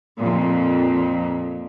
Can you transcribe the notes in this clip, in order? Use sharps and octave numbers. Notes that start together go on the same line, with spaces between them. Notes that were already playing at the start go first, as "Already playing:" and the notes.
F2 A#2